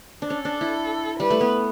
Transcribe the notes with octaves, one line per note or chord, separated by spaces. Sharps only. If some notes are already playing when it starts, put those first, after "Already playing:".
D4
C#4 A4
D4
E4
G3 B4
A3
B3